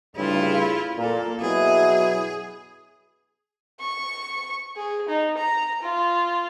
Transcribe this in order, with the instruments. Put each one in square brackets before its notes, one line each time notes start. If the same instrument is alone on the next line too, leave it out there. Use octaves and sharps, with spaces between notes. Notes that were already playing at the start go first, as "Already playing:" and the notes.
[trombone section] D2 G2 C#3 [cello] E4 F4
[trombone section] A#2 [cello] A#3 A4
[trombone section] B2 F#3 E4 [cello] G#4
[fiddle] C#6
G#4
D#4
A#5
F4